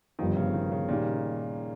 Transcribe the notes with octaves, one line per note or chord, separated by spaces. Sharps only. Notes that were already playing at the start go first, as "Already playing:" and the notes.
G1 G2 D#3 F3
C#3
D#3
C#3
A#2 D#3 G3